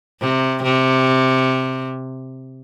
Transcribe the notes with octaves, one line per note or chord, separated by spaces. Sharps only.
C3
C3